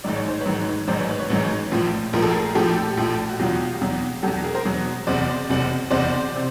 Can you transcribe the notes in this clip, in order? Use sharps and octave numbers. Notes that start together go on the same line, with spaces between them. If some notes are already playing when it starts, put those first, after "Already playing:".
A1 G#2 D#3 F#3 D5
C#5
C5
B4 C#5
A1 G#2 D#3 F#3
A1 G#2 D#3 F#3 C5 D5
B4 C#5
B4 C#5
B4 C#5
A1 G#2 D#3 F#3
A#1 A2 F3
A#1 A2 F3 A#4
A4
G#4 A#4
A#1 A2 F3 G4 A4
A#1 A2 F3
F#4
E2 B2 F#3 F4 G4
E2 B2 F#3
E2 B2 F#3 G4 A4
G#4 A#4
A#4 C5
E2 B2 F#3
F#1 E2 C3 C5 D5
F#1 E2 C3
F#1 E2 C3 C5 D5
C3